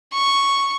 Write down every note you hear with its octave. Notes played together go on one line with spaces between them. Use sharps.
C#6